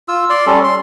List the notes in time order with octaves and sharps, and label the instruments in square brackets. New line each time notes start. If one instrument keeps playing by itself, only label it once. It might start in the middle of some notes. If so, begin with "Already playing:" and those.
[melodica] F4 E6
D5 C6
G3 C#4 A4
C6